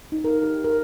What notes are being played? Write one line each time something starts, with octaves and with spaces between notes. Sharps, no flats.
D#4
A#4
G4
A#4